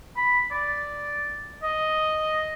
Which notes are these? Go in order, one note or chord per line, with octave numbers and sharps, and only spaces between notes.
B5
D5
D#5